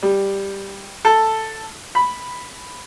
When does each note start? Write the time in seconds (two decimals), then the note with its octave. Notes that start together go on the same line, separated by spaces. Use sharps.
0.02 G3
1.05 A4
1.95 B5